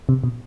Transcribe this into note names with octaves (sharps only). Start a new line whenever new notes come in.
C3
B2